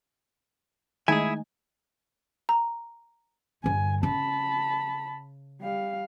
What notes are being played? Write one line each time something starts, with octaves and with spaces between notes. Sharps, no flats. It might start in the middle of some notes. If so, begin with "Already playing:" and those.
D#3 G#3 A3 D#4 E4 G#4 G#5
A#5
G2 D3 G#5
C#3 A5 B5
G3 F5